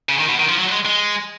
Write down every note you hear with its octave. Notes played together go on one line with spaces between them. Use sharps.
C#3
D#3
B2
D#3
F3
F#3
G#3
G#3